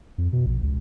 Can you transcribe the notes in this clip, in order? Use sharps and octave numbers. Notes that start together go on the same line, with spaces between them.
F2
B2
A#1
C#2